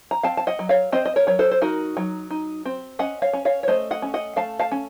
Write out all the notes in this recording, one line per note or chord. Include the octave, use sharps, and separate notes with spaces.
A#5
C4 F5 A5
A5
D#5 F#5
F#3
C#5 F5
C4 C5 D#5
D#5
A#4 C#5
F#3 C#5
A4 C5
C5
D#4 F#4 A#4
F#3
D#4
C4
C#4 D#5 F#5
C#5 F5
C#4
C#5 F5
C#5
A3 C5 D#5
D#5 F#5
C#4
D#5 F#5
A3 F5 A5
F5 A5
C#4